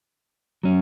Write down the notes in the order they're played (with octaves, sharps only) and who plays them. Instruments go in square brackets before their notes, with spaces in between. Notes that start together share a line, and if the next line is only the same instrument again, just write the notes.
[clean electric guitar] F#3 C#4